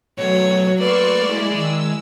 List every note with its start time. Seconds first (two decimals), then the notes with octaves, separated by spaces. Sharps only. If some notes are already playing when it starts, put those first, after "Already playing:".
0.18 B2 F#3 A3 C#5
0.80 A3 A#3 B4 D5 C6 C#6 E6
1.21 G#3 E4
1.52 D#3 G#3 E6